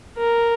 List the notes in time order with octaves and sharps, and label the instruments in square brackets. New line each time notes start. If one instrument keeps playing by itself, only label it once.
[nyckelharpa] A#4